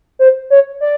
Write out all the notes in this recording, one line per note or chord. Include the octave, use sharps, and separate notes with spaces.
C5
C#5
D5